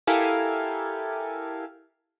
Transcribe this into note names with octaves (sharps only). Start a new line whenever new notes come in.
E4 G4 A4 A#4 F5 G#5